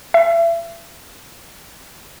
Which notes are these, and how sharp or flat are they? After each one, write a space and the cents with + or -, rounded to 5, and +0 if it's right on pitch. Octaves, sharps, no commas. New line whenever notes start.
E5 +35